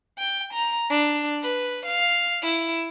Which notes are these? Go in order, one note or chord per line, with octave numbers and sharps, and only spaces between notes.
G5
A#5
D4
B4
F5
E4